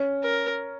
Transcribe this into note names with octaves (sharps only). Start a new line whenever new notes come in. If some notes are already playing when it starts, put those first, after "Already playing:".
Already playing: C#4
A#4